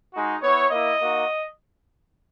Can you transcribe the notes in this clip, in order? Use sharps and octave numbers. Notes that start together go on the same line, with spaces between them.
G#3 D#4 F#4
B3 E4 C#5
A#3 E4 D#5
A#3 D#4 F#4